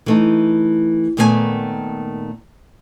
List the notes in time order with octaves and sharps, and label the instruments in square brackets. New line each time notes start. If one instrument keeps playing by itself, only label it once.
[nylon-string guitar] E3 A3 D#4
A#2 D#3 A3 B3 A#4 G#5